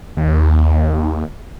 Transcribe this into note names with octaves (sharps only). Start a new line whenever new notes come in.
D#2